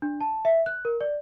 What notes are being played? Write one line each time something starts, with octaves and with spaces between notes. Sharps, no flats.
D4
A5
E5
F#6
A#4
D5